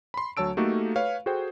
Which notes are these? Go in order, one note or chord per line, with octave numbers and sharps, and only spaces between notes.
B5 C6
D2 F#3 C#5 A5 E6 D7
A3 A#3 D#4 F#4 G4 A4
B4 C#5 F5
F#4 G#4 A4 C5 G5